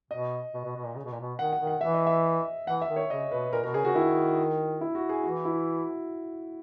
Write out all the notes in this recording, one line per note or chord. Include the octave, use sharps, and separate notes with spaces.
B2 D#5
B2
B2
B2
A#2
C#3
B2
A#2
B2
D#3 F#5
F#5
D#3
F#5
E3 E5
D#5
E5
E3 F#5
E5
D#3
C#5
C#3 D#5
B2 B4
A#2 A#4
B2 A#4
C#3 G#4
C#3 F#4
D#3 E4
E4
F#4
G#4
E3 F#4
E4